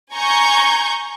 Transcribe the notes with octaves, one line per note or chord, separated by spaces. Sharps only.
G#5 A#5 C#6 G6